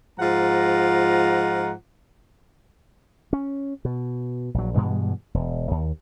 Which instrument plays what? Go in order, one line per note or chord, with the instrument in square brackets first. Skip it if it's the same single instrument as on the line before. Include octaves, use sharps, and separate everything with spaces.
[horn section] G#2 F3 F4 F#5 A#5
[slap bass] C#4
B2
A#1 F#3
G2 B2 E3 G#3
E1
D#2